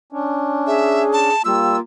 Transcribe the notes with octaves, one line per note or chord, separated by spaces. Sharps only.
C#4 D4
G#4 E5
A5
G3 A#3 F4 E6